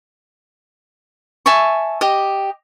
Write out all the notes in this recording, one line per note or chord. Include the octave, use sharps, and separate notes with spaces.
E5 G#5 A5 C#6
G4 D#5